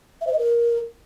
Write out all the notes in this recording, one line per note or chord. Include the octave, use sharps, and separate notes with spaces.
E5
C5
D#5
A#4